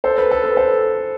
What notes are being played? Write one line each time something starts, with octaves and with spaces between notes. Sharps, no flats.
A4 C5
B4
A4
B4
A4 C5